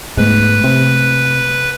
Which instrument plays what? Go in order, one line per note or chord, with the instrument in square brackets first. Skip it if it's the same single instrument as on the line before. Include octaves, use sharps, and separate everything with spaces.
[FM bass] G#2 [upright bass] A3 B3 [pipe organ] B4
[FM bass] C3